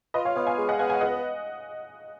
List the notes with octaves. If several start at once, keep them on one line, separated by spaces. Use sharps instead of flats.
F4 B4 D#5
C#5 F5
B3 C#5 F5
F5 G#5
G#3
D#5 F#5
B3 F5 G#5
F5 G#5
C#2 D#5 F#5